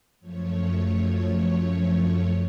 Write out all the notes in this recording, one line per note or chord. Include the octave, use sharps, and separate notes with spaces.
F#2 F3 A3 C#5